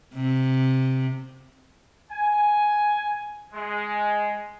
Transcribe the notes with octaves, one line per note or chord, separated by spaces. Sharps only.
C3
G#5
G#3